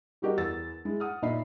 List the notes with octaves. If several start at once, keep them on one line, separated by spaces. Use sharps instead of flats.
G3 F#4 G4 A#4 D#5
E2 B3 A#4 E6 A6
G#3 E4
F#5 D#6 F6
A#2 D#4 D#5 E5 B5 C7